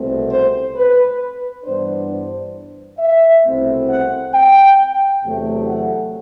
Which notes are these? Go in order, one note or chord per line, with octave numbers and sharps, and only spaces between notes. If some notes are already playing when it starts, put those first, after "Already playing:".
Already playing: C2 B2 A3 C4
C5
B4
G2 E3 B3 D4 C5
C5
E5
C2 B2 A3 C4 E4
F#5
G5
E2 C3 F#3 A3
F#5